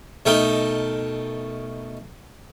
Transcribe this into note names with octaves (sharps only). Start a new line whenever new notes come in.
B2 A3 D#4 A#4 G5